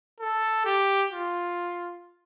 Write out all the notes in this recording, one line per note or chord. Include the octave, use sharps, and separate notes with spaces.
A4
G4
F4